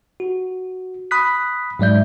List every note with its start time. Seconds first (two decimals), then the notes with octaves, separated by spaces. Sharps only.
0.20 F#4
1.11 B5 D#6 F#6 B6
1.79 G#2 F#3 G#3 D5 E5 G6